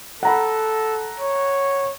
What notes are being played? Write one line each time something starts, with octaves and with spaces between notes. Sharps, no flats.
A4 F#5 A#5 B5
C#5